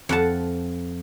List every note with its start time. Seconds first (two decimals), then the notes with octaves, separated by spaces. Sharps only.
0.09 F2 F#5 A5